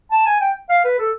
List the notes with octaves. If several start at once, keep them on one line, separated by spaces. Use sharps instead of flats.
A5
G#5
G5
F5
B4
A4